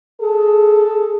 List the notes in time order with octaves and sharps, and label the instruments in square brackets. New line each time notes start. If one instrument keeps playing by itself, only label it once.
[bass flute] G#4 [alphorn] A4